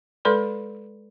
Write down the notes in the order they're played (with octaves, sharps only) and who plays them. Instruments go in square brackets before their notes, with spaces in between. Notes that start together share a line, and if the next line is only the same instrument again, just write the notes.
[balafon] G#3 A4 B4 D5 B5 C6